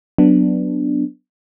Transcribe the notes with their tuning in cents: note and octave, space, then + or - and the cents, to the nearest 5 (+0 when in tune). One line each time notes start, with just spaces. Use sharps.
F#3 +0 B3 +0 D4 +0